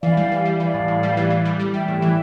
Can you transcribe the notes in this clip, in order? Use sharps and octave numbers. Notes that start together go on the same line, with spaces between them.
E3 D5 F5
G3
E3
G3
E3 D5 F5
A2
A2
G3
E3
E3
G3
G3
G3 E5 G5
A2
E3